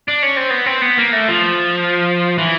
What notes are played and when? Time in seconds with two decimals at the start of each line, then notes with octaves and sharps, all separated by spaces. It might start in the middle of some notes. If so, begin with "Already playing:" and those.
0.08 D4
0.23 C#4
0.37 C4
0.50 B3
0.66 C4
0.81 B3
0.97 A#3
1.12 A3
1.28 F3
2.38 E3